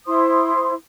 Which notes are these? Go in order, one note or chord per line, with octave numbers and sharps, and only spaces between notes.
E4 C5 C6 D#6